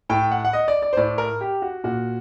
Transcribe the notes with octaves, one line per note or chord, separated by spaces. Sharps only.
A2 G5
F#5
F#5
D#5
D5
D5
C5
A2 D5
A#4
G4
F#4
A#2 F#4